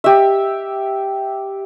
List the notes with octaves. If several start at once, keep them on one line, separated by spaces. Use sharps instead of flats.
G4 E5